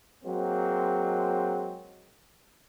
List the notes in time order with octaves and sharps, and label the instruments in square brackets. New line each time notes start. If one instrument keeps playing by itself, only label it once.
[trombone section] F#3 G#3 A#3 C4